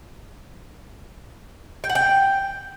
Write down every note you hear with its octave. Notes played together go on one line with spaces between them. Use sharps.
G5
F#5
G5